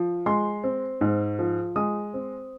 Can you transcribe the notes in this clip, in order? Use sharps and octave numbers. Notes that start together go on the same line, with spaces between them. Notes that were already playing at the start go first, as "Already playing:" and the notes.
Already playing: F3
G#3 C6
C4
G#2
F3
G#3 D#6
C4